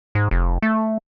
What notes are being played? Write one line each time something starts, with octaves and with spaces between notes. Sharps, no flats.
G#2
F1
A3